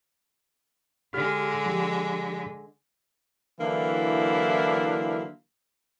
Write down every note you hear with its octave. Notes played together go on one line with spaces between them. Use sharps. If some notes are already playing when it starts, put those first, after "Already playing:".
D3 G#3 G4 F6
F3 G4
D3 E3 F#3 A#3 D4 E4